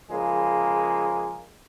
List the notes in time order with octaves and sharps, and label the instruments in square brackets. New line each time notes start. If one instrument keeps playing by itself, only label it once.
[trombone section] C#3 F3 G#3 A#3